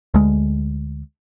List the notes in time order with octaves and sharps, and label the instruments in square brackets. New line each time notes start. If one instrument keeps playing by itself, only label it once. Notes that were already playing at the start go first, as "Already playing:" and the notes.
[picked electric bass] D2 G#3